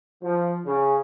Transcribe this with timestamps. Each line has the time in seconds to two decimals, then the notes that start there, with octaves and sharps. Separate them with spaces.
0.21 F3
0.64 C#3